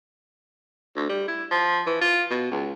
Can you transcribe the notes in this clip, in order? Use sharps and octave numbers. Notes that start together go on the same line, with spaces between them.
D2
G3
E4
F3
E3
F4
B2
C#2